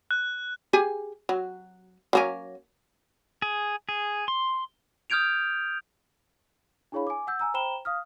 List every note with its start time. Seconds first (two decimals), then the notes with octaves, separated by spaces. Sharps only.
0.11 F#6
0.73 G4 G#4 G#5
1.29 F#3
2.13 F#3 A#3 C#4
3.42 G#4
3.89 G#4
4.28 C6
5.10 D#6 F6 G6 G#6 D7 F7
6.92 D4 E4 G#4 C#5 F5 B5
7.07 G#5 D6
7.27 F#5 E6 G6
7.39 G#5 A#5 E6
7.54 C5 G5 A#5 B5 E7 G7
7.85 F5 D#6 F6